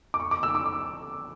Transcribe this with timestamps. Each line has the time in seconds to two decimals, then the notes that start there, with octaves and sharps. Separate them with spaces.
0.14 D6
0.20 C#6
0.31 D6
0.43 E6
0.55 D6
0.66 D6